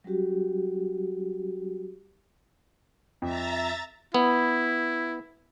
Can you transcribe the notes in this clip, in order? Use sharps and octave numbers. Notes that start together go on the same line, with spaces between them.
F#3 G3 C#4 F#4 G4
F2 E5 A#5 A6
B3 E4